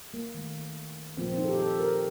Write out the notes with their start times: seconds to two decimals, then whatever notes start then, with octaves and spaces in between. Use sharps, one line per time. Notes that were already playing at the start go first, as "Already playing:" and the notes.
0.14 A#3
0.34 D#3 A3
1.17 A#2 F3 A#3 C4
1.27 C4
1.38 D#4
1.44 A4
1.49 G4
1.59 A4
1.80 A#4